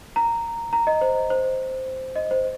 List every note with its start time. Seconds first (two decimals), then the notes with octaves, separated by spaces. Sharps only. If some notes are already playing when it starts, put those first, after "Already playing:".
0.16 A#5
0.73 A#5
0.87 D#5
1.01 C5
1.30 C5
2.16 D#5
2.31 C5